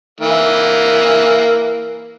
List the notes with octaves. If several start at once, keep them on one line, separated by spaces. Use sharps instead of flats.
E3 A#3